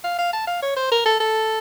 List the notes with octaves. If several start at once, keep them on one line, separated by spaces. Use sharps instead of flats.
F5
F5
A5
F5
C#5
C5
A#4
A4
A4